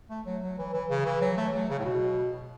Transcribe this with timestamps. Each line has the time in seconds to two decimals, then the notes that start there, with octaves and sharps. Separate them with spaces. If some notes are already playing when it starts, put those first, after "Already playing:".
0.10 A3
0.26 F#3
0.42 F#3
0.58 E3
0.74 E3
0.90 C#3
1.06 E3
1.21 F#3
1.37 A3
1.54 F#3
1.70 C#3
1.79 A2
1.85 B2